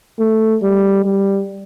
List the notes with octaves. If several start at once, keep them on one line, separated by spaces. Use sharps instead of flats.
A3
G3
G3